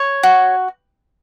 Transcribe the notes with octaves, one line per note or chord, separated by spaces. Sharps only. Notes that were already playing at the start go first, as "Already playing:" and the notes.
Already playing: C#5
F#4